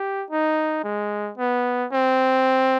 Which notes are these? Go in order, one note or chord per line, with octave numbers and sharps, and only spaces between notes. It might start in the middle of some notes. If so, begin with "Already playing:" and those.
Already playing: G4
D#4
G#3
B3
C4